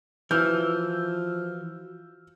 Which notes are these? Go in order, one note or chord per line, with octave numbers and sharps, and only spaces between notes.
E3 F3 F#4 E6 F6 G6